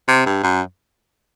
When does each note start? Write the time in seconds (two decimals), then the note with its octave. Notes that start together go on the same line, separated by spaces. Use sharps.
0.08 C3
0.26 G2
0.43 F#2